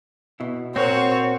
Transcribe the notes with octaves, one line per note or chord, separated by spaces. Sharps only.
B2 E4
A#2 C4 F#4 A#4 C5 C#5